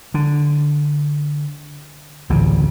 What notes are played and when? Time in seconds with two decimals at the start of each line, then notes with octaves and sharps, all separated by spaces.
0.14 D3
2.30 A1 D2 A#2 C#3